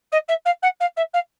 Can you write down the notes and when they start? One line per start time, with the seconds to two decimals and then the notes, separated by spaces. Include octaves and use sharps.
0.12 D#5
0.28 E5
0.45 F5
0.62 F#5
0.80 F5
0.96 E5
1.13 F5